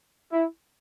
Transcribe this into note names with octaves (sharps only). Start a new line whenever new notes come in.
E4